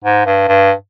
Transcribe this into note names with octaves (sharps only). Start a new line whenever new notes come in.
G#2
G2
G2